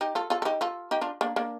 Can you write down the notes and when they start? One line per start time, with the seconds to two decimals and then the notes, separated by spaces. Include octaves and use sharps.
0.01 D#4 G4
0.15 F4 A4
0.30 F4 A4
0.42 A4
0.45 D#4 G4
0.61 F4 A4
0.91 D#4 G4
1.01 D4 F4
1.21 A#3 D4
1.36 A#3 D4